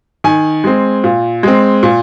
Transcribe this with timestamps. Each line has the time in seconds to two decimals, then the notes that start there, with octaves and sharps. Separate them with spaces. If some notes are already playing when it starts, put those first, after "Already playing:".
0.24 D#3 G#5
0.64 G#3 C4
1.04 A#2
1.43 G#3 C4
1.83 A#2